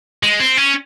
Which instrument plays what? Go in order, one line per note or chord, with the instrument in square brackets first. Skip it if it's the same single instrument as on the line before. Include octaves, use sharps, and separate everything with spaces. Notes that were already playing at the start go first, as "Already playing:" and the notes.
[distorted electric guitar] G#3
C4
C#4